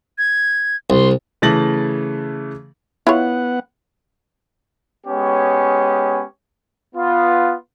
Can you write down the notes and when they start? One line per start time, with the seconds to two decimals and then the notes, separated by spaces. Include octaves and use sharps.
0.18 G#6
0.90 C2 C6
1.42 C#3 E3 A3 A6 A#6 F#7
3.07 B3 E4 F4 C#5 F#5
5.06 G#3 B3 C#4 G4 C#5
6.96 B3 F4